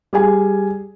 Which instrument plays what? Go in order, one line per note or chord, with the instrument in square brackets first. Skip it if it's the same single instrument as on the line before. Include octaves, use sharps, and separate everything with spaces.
[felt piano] G3 G#4 G#5